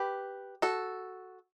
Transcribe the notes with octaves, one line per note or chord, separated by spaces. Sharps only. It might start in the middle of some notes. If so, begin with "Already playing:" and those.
Already playing: G4 B4
F#4 A4